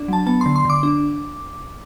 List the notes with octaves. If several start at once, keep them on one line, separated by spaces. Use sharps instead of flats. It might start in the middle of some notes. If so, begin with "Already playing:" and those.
Already playing: D4
F#3 A5
B3 A5
D3 C6
C6
D3 D6
D4